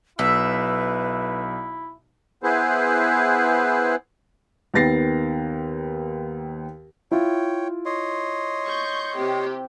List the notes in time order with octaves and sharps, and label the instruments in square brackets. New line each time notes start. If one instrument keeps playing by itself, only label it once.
[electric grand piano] B1 [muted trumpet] E4 [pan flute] B4 [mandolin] E5
[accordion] B3 E4 G#4 B4 C5
[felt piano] D#2 D#3 B3 A6 A#6 C7
[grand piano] E4 F4 [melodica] C#5 G5
[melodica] C#5 D#5 C6
[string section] C#6 G6
C3 G4